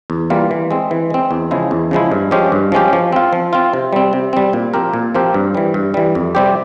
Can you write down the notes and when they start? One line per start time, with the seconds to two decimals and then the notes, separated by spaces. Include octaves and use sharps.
0.10 E2
0.30 E3 G3 A#3 F4
0.51 E3
0.71 G#3 C4
0.91 E3
1.10 G#3 C4
1.31 E2
1.51 C#3 F3 G#3 E4
1.71 E2
1.91 C#3 F3 G#3 E4
2.11 G2
2.31 F3 G#3 C#4 G4
2.52 G2
2.72 F3 G#3 C#4 G4
2.93 F3
3.13 C4 F4
3.33 F3
3.53 C4 F4
3.73 C3
3.93 G3 C4
4.13 C3
4.33 G3 C4
4.53 A#2
4.74 F3 C4 G4 A#4
4.94 A#2
5.15 F3 C4 G4 A#4
5.34 G2
5.55 E3 G3
5.74 G2
5.94 E3 G3
6.15 F2
6.35 C3 G3 C4 G4